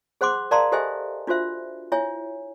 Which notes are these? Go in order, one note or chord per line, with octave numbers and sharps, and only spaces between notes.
G#4 C5 F#5 C6 D6
A#4 D5 F5 A5 A#5 C6
G4 A4 C5 D#5 E5 G#5
D4 F4 F#4 C5 E5
E4 C#5 E5 G#5